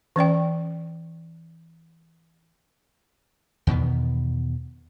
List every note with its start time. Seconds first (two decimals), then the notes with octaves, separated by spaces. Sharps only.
0.16 E3 C#4 D5 G5
3.67 E2 B2 D#3 B3